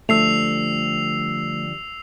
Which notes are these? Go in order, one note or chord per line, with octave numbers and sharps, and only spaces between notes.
D3 F3 G3 A3 E6 C7 F7